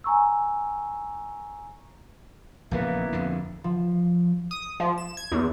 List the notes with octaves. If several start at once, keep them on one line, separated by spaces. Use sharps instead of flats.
G#5 A#5 C#6 E6
A#1 C#3 E3 A#3 B3 E4
F2 D3
F3
D#6
F3
E7
G#6
E2